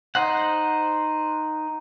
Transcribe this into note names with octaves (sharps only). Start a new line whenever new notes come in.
D#4 C5 F#5